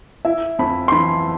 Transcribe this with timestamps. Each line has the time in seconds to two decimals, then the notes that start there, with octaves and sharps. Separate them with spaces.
0.25 E4 E5
0.59 F2 B5
0.88 C6
0.92 E3 B5